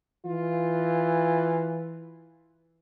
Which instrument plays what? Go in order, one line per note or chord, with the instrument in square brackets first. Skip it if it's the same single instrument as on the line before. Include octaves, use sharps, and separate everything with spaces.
[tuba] E3 [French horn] F4